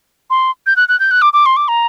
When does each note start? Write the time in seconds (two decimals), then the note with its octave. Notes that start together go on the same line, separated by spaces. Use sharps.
0.30 C6
0.66 G6
0.76 F#6
0.89 F#6
1.00 G6
1.11 F#6
1.22 D6
1.33 D6
1.46 C6
1.57 D6
1.68 A#5